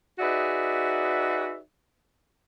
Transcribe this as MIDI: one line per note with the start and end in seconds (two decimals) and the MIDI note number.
0.19 1.58 63
0.19 1.58 66
0.19 1.58 68
0.19 1.58 71
0.19 1.58 74
0.19 1.58 76